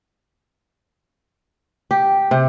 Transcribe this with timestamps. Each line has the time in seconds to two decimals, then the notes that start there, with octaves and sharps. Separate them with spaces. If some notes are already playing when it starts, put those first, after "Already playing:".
1.91 G4
2.31 C3